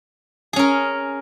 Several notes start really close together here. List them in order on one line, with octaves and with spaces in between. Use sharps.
G#4 C#4 A#4